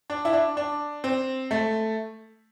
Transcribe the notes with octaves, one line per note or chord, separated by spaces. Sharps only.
D4
E4
D4
D4
C4
A3